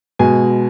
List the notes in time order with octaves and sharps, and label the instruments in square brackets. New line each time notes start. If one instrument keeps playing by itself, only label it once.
[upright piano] B2 G#3 G#5